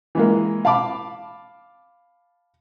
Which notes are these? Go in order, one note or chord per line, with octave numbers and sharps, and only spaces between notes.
E3 G#3 A#3
F5 A5 B5 D6